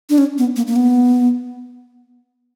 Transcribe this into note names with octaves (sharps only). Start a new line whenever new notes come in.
D4
C#4
B3
A#3
A#3
B3